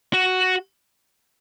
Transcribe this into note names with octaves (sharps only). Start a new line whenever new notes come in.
F#4